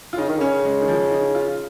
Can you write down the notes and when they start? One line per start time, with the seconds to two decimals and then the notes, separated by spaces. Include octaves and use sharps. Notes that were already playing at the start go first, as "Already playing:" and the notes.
0.13 F4
0.17 C#3 D#4
0.29 D#3
0.39 C#3 C#4
0.65 G#3
0.81 D#3
0.88 F3
1.11 D#4
1.35 F4